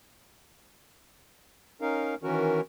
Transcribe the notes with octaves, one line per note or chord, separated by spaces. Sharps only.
C#4 D#4 A#4 F5
D#3 E3 C#4 F#4 A#4